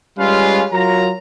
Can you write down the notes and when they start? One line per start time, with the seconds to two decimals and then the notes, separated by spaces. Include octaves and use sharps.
0.18 G3 G#3 C#4 F4 B4 F5
0.73 F#3 F4 A#4 A#5